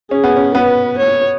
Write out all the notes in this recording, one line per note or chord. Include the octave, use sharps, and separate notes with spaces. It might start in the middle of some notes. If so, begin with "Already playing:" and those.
C#4 G#4
B3
C#4
B3 B4
C#5